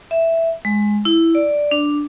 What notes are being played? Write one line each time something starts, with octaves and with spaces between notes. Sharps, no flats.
E5
G#3
E4
D5
D4